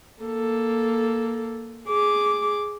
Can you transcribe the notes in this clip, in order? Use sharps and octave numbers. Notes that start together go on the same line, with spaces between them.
A#3 A4
G#4 D6